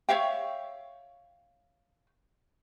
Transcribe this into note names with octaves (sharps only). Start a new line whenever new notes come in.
C#5 E5 F5 G5